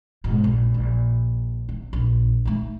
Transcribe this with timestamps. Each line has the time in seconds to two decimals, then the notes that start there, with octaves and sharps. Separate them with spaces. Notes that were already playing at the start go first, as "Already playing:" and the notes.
0.24 G#2 B2
0.44 A#1
0.74 A#1
1.69 C3
1.93 A#1
2.45 A3 D#4